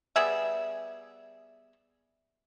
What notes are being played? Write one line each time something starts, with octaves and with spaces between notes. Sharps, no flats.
G3 B3 G#4 E5